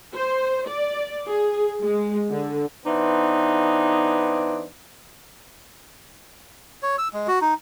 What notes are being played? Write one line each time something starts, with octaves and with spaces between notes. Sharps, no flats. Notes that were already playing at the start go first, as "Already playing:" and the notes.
C5
D5
G#4
G#3
D3
E3 B3 D4 D#4 C5
C#5
E6
G#3
F#4
D#4